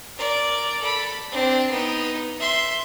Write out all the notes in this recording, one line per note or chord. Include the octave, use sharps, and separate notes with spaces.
A#4 D5
A4 B5
C4 D4
B3 D#4
E5 C6